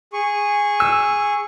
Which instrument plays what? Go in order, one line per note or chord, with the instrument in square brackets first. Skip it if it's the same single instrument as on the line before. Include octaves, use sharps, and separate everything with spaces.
[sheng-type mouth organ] G#4 C#6
[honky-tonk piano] E6